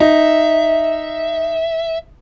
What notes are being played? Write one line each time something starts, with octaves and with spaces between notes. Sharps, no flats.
D#4 E5